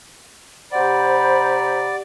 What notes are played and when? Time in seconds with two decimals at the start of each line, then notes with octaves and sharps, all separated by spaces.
0.72 C3 G4 C5 D5 F#5 A#5 B5